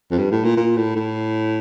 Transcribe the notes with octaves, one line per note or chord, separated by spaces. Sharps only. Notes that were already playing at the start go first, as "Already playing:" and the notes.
F2
G2
A2
A#2
A#2
A2
A2